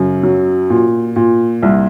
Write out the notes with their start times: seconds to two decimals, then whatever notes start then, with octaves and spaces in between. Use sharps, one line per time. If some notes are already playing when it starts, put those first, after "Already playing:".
Already playing: F#2 C#3
0.23 F#3
0.70 A#2
1.16 A#2
1.62 C2